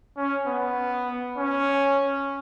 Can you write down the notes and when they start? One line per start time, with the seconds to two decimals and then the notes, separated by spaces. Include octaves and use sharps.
0.17 C#4
0.47 B3
1.37 C#4